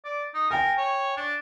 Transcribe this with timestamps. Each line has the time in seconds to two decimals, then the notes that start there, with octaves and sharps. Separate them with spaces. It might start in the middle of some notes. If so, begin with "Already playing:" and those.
0.05 D5
0.34 D#4
0.51 A#4 G5 G#5
0.77 C#5
1.17 D4